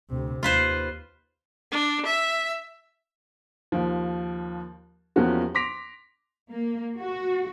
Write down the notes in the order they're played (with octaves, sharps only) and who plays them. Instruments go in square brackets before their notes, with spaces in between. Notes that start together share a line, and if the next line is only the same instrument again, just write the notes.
[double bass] D2 C3
[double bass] D#2 [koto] F4 B4 C5
[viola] D4
E5
[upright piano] D#2 F3
E2 F3 A#3 C#4 F#4 G4
C6 D6 A#6 B6 D7 F7
[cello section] A#3
F#4